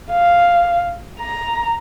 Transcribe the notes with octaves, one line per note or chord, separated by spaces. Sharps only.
F5
A#5